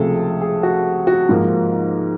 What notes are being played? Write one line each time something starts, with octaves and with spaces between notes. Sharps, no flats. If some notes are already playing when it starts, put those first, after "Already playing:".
Already playing: C#2 C3 F3 A3 G#4 A4
G#4
F#4
F#4
G#2 F3 A#3